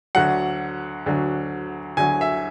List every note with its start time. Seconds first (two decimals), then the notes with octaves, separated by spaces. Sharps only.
0.15 D2 D3 F#3 F#5
1.06 D2 D3 F#3
1.97 D2 D3 F#3 G#5
2.21 E5